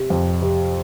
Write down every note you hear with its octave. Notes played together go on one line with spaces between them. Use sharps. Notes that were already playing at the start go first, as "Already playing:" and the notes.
Already playing: C3
F2
C3